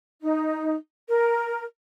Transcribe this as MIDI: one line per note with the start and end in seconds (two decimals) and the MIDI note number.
0.21 0.75 63
1.09 1.63 70